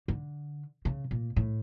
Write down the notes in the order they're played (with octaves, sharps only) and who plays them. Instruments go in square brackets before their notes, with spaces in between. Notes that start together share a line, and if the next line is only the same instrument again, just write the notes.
[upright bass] D3
C#3
A#2
A2